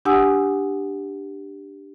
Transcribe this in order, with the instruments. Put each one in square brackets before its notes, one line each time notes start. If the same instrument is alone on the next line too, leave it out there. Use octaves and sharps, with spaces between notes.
[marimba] D4 G4 F#5 G#5 D#6 E6